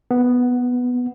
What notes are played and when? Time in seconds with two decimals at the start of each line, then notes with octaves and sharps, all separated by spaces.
0.11 B3